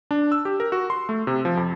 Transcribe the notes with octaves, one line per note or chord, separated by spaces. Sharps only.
D4
E6
G4
A#4
F#4
C6
A3
C3
F3
F2